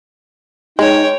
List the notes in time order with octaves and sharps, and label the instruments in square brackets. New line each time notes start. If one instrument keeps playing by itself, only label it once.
[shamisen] G#3 [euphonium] D#4 [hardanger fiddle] C#5 G5